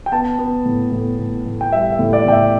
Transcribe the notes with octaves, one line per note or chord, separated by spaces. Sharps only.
G5
B3 A5
B3
A2
A2
A2
A2
G5
G3 E5
E5
A2
D5
A2 G5
E5